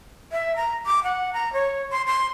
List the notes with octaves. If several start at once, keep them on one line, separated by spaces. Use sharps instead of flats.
E5
A#5
D6
F#5
A#5
C#5
C6
C6